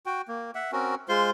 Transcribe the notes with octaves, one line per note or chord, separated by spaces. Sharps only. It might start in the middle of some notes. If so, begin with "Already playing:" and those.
F#4 G5
A#3
E5 F#5
C4 C#4 F#4 A#4
G#3 F4 C5 C6